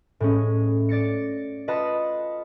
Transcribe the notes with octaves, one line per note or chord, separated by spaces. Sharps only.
A2 G#3 C#4
D5 A6 A#6 C#7
F4 B4 D#5 F#5 A5 B5